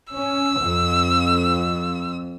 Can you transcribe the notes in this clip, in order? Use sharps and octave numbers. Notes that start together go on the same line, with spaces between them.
C#4 E6
F2